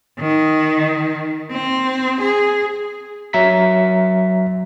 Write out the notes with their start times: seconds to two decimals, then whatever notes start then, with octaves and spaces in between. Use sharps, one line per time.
0.19 D#3
1.52 C4
2.21 G#4
3.33 F#3 E5 A#5 B6